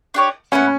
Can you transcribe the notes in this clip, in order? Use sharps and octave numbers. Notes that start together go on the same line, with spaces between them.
D4 G4 C#5
B3 C#4 E4 B4 F#5